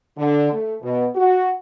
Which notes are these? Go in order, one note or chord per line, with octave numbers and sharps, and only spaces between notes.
D3
A3
B2
F#4